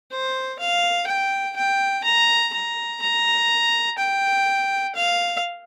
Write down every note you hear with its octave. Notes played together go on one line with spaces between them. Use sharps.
C5
F5
G5
G5
A#5
A#5
A#5
G5
F5